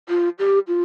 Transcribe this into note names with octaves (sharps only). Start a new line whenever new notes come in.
F4
G4
F4